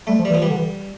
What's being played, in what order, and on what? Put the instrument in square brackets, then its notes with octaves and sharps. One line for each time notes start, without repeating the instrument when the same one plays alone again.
[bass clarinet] G3 [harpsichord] A3
[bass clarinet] F3
[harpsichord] G3
[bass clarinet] E3
[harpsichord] F3
[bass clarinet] E3 [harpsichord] G3
[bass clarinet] D3
E3